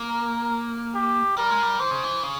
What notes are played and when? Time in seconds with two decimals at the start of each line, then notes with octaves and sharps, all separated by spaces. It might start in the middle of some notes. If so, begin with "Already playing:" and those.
Already playing: A#3
0.09 A#4
0.95 G4
1.37 G3 A#4
1.50 G#3
1.62 G3
1.80 E3 C5
1.91 C#3
2.03 E3
2.23 C#3